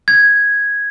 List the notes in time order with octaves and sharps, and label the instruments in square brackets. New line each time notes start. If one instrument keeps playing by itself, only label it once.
[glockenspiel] G#6